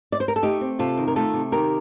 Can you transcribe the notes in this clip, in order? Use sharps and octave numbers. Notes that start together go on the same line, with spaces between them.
D5
C5
A#4
A4
A3 D#4 G4
C4
C3 F4 A4
D#3
A#4
A3 F4 A4
C3
D#3 G4 A#4